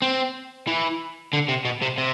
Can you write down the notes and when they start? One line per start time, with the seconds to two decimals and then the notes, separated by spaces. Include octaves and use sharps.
0.02 C4
0.67 E3
1.33 D3
1.49 C3
1.65 B2
1.82 C3
1.98 C3